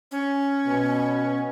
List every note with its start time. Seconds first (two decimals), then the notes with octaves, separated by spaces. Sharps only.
0.11 C#4
0.66 B2